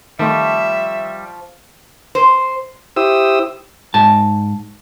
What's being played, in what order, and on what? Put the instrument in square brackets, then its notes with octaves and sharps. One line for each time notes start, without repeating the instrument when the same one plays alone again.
[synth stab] D#3 A3 C4 [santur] F3 F4 C#6 [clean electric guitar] G3 [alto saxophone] E5
[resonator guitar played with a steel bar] C5
[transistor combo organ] E4 G4 C5 D#6 E6
[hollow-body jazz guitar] G#2 A5